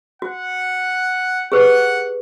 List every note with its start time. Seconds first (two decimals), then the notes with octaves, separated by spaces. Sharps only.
0.22 F#4 F#5
1.52 G4 G#4 B4 F#5